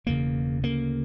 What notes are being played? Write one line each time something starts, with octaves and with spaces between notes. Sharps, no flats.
E1 E2 C#3 A#3
D2 C#3 A#3